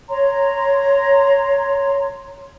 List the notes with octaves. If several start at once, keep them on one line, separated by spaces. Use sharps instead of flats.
C#5 A#5 C6